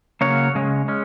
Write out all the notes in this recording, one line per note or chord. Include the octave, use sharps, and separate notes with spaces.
C#3 F#3 A#3 C#4 C#5
C#3 G#3 C#4
G#3 C#4